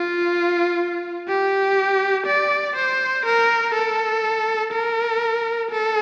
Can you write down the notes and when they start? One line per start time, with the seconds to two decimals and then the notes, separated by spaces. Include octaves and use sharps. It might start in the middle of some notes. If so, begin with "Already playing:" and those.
Already playing: F4
1.28 G4
2.27 D5
2.76 C5
3.26 A#4
3.75 A4
4.73 A#4
5.71 A4